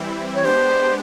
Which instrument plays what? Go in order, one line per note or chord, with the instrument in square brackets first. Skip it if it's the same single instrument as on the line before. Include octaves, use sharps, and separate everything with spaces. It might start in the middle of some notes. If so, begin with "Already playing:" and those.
Already playing: [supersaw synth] E3 G3 C4 E4
[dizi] C#5
[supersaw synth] G#3 B3 D4 G4 [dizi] C5